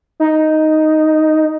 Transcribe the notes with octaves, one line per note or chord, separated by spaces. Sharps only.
D#4